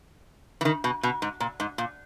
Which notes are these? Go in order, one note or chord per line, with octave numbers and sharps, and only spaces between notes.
E3
D#3
B2
B2
G#2
A#2
G#2
A#2